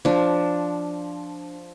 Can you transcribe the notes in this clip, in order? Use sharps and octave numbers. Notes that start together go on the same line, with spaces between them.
F3 D4